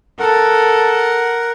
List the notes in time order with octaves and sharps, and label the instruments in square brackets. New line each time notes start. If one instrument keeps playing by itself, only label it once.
[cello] A4 [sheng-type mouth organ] A#4 F#5